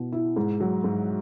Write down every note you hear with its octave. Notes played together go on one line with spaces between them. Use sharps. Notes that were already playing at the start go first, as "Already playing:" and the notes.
Already playing: B2 E4
E4
G#2
F#3
G#2